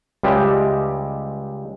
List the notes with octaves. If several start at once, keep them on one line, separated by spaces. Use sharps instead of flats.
C#2 G3 G#3 G4 E5